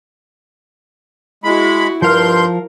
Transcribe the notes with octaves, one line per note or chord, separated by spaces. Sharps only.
G#3 E4 F#4 B5
G2 F3 A#4 F5 C6 F6 G6